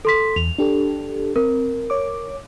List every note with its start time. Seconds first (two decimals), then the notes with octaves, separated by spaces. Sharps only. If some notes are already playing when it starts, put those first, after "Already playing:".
0.05 A4 C6 B6
0.36 E2 F7
0.58 D4 G4 A4
1.36 C4 A#4
1.90 C#5 D6